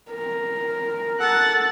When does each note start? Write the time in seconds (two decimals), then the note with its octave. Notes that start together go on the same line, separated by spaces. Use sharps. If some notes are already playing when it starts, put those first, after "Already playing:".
0.10 A#4
1.20 A4 F#5 F#6 A6